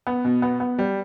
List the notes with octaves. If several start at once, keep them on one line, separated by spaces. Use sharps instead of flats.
B3
B2
B3
B3
G3